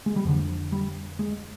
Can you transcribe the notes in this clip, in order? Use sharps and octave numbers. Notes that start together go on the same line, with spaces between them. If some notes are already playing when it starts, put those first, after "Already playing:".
G#3
G3
F2 D3 F3
G3
G#3